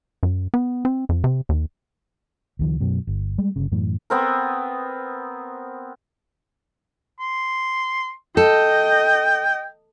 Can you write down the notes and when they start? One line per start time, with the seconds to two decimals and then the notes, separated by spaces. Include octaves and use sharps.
0.23 F#2
0.54 B3
0.85 C4
1.09 F2
1.24 C3
1.49 D#2
2.59 C#2 D#3 F3
2.80 F#2 B2 F#3
3.07 G1
3.38 G3 G#3
3.56 G1 C#3
3.72 F#2 A2 E3
4.10 B3 C4 A#4
7.19 C6
8.37 A4 D#5 G5